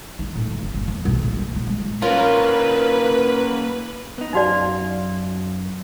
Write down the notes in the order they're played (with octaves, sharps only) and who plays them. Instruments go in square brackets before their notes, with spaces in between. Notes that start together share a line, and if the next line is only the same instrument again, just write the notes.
[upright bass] D#4
A2
F#3
G1
F#1
E2
B1
A1
C#2
A#2
G#3
[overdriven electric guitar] A#3 C#4 [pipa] F4 [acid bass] A#4 [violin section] B4
[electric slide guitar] B3 D#4
[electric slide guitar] F#2 F5 [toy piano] D#4 F#4 D5